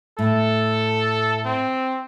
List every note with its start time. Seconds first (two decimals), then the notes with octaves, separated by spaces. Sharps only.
0.19 A2 A4
1.45 C4